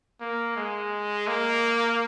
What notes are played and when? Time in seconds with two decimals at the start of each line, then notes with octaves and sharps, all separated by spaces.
0.21 A#3
0.56 G#3
1.28 A#3